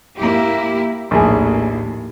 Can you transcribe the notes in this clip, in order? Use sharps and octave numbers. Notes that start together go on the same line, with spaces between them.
A#3 E4 G4
A#1 D#2 A2 G#4